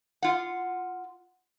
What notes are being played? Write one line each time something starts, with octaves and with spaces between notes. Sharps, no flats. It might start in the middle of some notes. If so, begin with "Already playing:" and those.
F4 F#5